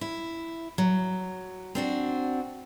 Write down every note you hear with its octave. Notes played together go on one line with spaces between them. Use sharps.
E4
F#3
C4 D4 F#4